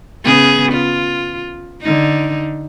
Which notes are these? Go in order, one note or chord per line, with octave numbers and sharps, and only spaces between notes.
C#3 B3 G#4
F4
D3 D#4